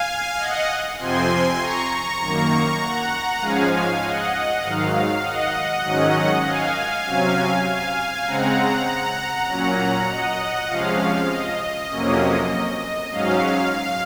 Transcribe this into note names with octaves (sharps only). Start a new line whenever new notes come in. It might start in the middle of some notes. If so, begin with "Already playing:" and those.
Already playing: F5 G#5
D#5 F#5
F2 C3 F3 C4 G#5 C6
A#5 C#6
A#5 C#6
F#2 D#3 A#3
F#5 A#5
G#2 F3 G#3 C#4 F5 G#5
D#5 F#5
G#2 D#3 F#3 F5
F5
D#5 F#5
G#2 D#3 F#3 C#4
F5 G#5
C3 F#3 C#4
F5 G#5
C#3 G#3 C4 F#5 A#5
A#2 F#3 C#4
D#5 F#5
C3 F3 G#3 C#4 F5
D#5
F2 C3 F#3 A#3 C#4
G#2 F#3 C#4 F5
F5